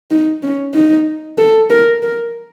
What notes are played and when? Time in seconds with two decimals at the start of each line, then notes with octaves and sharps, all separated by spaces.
0.11 D#4
0.43 C#4
0.74 D#4
1.38 A4
1.70 A#4
2.03 A#4